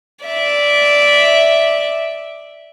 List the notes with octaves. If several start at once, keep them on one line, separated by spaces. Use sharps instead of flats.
D5 E5